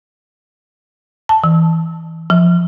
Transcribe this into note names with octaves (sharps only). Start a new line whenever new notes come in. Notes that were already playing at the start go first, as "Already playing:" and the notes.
A5
E3
F3